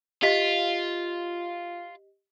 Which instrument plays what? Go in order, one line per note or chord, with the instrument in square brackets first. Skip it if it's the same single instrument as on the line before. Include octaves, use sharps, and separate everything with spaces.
[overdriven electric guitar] F4 [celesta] G4 D#5 B6